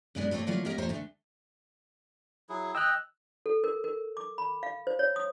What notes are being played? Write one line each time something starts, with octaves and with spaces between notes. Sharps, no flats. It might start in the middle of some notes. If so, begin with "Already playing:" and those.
F#2 B2 G#3 B3 D4
G2 A3 A#3 C4 C#5
D3 F#3 A3 A#3 E4 F4
G#3 A#3 B3 C#4 G4 A#4
F2 A#2 A3 C5 C#5 A#5
D2 D3 A3
F#3 E4 G#4
D#5 G5 E6 F#6
A4
A#4
A#4
D6
B5
F5
C5
C#5
D#6